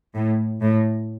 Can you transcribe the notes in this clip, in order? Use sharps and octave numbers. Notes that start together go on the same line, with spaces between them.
A2
A2